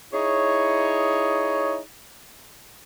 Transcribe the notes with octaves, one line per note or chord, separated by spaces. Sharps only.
D#4 E4 G#4 C#5